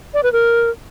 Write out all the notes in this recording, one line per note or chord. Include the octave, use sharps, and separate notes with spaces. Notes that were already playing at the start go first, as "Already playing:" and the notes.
D5
B4
A#4